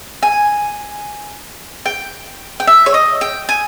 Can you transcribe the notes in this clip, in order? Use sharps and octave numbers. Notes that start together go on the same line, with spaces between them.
G#5
G5
G5
E5
C#5
D#5
G5
G#5